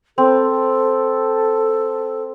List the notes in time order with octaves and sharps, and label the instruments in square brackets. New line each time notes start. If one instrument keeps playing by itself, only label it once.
[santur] C4 [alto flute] A4